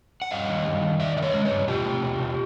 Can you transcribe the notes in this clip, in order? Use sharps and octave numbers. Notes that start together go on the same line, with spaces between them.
F#5
G2 D#5 F5
D#3
G2
D#3
D#3 D5 E5
D#3 E5
C#5 D#5
G#3
B4 C#5
G2
B2 F4 G4
A3
B2
B2